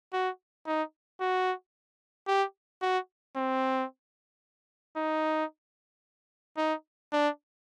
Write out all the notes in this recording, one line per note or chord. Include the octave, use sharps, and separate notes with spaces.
F#4
D#4
F#4
G4
F#4
C4
D#4
D#4
D4